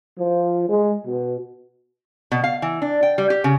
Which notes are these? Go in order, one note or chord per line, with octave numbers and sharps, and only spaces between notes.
F3
G#3
B2
B2
F5
E3
D4
G5
G3
G4
C#3